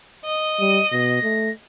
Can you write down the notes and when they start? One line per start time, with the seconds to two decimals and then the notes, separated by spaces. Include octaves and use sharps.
0.25 D#5
0.60 G3 D#7
0.92 B2 A#6
1.23 A3